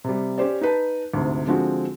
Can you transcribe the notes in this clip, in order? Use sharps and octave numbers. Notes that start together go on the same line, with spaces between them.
C3 G3
C#4 G4 C5 D5
D#4 B4 A5
D2 G#2 C3
D3 F3 G#3 C4 F#4